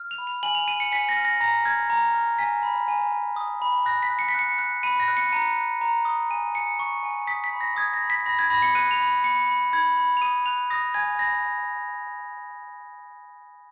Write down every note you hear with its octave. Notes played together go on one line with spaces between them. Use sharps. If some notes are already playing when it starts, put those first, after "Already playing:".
Already playing: F6
F7
B5
F7
G#5 F#7
F7
G#5 D#7
C#7
G#5 B6
A#6
F6
A#6
A#5 A#6
F6 G#6
A#5
F6
G#5 B6
B5
G#5
G#5
D#6
B5
F#6 A#6
B6
F#6
C#7
B6
F#6 C#7
F#6
B5 D#7
A#6
F#6
C#7
A#5 D#7
F#6
A#5
D#6
G#5 D#7
G#5 C#7
C#6
G#5
D#6 B6
B6
B5
A#6
D#6 G#6
A#6
B5
B6
B5 A#6
G#6
B5 A#6
C#7
F#6 D#7
F7
B5
F7
B5 C#7
B5
B5 G#6
B5
F7
D#6 D#7
F#6 F7
D#6 A#6
G#5 G#6
B5 A#6